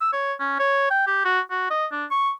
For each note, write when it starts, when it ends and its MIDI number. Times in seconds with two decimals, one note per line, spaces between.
0.01 0.11 88
0.13 0.33 73
0.40 0.57 61
0.59 0.86 73
0.90 1.02 79
1.07 1.22 67
1.25 1.40 66
1.51 1.66 66
1.70 1.86 75
1.92 2.05 62
2.11 2.32 85